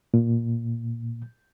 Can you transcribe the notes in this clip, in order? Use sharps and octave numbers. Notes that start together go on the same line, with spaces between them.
A#2